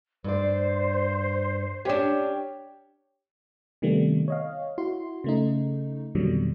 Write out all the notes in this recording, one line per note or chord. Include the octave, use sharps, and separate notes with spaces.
G2 C5 D5
C#4 D4 G4 C#5
C3 D#3 G3 A3 B3
C#5 D#5 F5
E4 F#4 C6
C#3 A3 D#4
F2 B2 D3 D#3 F#3 G3